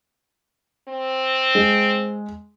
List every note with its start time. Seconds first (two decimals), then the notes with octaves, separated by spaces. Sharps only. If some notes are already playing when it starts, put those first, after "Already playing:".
0.89 C4
1.55 G#3